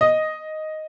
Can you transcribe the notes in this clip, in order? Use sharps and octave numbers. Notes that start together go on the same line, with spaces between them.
D#5